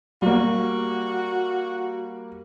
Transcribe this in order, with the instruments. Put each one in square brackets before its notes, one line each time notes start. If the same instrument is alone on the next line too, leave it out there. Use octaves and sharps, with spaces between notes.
[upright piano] G3 A#3 [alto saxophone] F#4